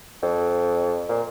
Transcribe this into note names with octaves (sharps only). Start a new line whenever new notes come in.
F2
A#2